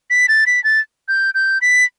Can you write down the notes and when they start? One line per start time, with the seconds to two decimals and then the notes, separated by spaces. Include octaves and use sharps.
0.10 B6
0.28 A6
0.46 B6
0.64 A6
1.08 G6
1.34 G6
1.62 B6